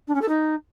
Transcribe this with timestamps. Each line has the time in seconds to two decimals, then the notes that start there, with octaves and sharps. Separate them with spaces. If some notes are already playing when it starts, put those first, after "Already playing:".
0.08 D4
0.15 C#4
0.22 A4
0.29 D#4